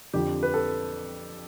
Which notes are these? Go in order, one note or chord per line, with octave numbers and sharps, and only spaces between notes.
F2 D3 F3 G4
B4
A4